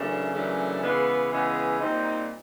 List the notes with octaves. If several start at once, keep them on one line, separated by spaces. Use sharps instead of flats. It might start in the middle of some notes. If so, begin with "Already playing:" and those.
Already playing: F#2 C#3 E3 A3 D4
F#2 C#3 E3 A3 D4
C#3 E3 G#3 B3
C#3 E3 G#3 B3
A#2 G3 C4 D#4